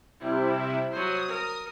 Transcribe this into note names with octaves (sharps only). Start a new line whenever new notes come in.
C3 G3 E4
F#3 C5 D#6
A#4